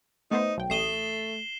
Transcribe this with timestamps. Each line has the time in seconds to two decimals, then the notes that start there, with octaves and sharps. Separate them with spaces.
0.31 A3 B3 D#4 C5
0.57 B1 G5
0.70 A1 A3 D#6 C7 E7 G7